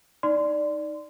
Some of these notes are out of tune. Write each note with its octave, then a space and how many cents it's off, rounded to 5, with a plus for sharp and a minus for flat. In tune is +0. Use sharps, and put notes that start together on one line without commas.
D#4 +0 D5 +0 C6 -20